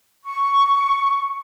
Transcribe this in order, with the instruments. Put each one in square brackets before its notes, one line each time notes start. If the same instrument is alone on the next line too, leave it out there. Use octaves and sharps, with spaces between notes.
[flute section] C#6